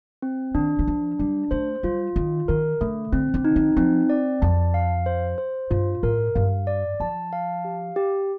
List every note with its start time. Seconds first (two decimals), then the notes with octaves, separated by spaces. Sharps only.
0.22 C4
0.55 D#3 D4
0.79 D#3
0.87 F3 D4
1.19 G3 D4
1.51 A3 C5
1.83 G3 F4
2.16 D#3 F4
2.48 D#3 A#4
2.81 D3 A3
3.12 D3 C4
3.34 D3
3.45 D#4
3.56 D#3
3.77 F3 C4
4.10 D5
4.42 F2 A5
4.74 F5
5.06 C5
5.38 C5
5.70 G2 F4
6.03 A2 A#4
6.35 G2 F5
6.67 D5
7.00 F3 A5
7.33 F5
7.65 G4
7.96 G4